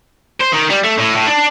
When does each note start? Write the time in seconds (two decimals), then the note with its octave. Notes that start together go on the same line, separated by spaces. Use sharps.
0.41 C5
0.53 D#3
0.70 G3
0.84 A3
0.98 A2
1.15 A2
1.27 D4